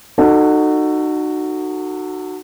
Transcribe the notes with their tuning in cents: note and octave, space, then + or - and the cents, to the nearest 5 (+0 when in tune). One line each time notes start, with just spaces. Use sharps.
D#4 -30 F#4 +0 A4 +15